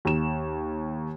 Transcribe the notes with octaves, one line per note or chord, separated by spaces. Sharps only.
D#2 E7